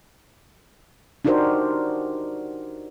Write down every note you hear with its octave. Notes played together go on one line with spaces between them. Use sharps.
D4 D#4 F#4 G4 A#4 C5